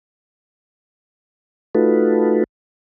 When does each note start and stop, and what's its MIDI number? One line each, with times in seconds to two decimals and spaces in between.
1.75 2.44 57
1.75 2.44 63
1.75 2.44 65
1.75 2.44 66
1.75 2.44 69
1.75 2.44 71